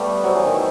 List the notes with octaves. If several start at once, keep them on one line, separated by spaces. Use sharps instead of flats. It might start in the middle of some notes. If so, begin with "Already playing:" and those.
Already playing: G3 A3 B3
F#3 C5
E3
D#3